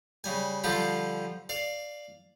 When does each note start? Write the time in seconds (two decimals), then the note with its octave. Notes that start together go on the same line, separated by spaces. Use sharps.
0.24 C#3 G3 G#5
0.64 D3 F3 G3 D4 F4 G4
1.49 D5 F5